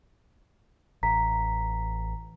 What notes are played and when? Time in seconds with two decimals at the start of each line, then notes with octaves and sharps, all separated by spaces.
1.03 A1 A#5 B6